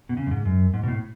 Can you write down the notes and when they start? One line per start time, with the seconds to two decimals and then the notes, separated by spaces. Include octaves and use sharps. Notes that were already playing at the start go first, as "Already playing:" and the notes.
0.09 B2
0.17 C#3
0.26 F#2
0.31 G#2
0.45 F#2
0.74 G#2
0.83 B2
0.88 A2